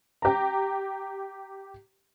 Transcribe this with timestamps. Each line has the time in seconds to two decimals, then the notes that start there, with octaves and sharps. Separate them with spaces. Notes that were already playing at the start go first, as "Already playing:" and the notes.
0.22 G4 A#5